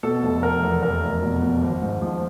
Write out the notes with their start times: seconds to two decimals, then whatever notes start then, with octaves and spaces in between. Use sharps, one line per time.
0.03 B2 A4
0.23 F1
0.43 F1 A#4
0.63 E2
0.82 F1 A#4
1.03 F1
1.22 B2
1.42 B2
1.62 G#1
1.82 G#2
2.02 F3